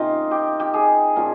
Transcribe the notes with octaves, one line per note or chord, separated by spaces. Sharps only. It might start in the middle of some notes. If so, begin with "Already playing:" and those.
Already playing: C3 D#3 A#3 C#4 D#4 F4 G4
G4
G4
G#4
A#2 F3 A#3 C#4 A#4